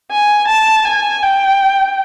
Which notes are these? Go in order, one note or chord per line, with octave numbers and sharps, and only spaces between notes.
G#5
A5
G#5
G5